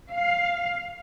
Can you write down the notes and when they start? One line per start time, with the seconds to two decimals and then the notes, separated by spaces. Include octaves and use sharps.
0.13 F5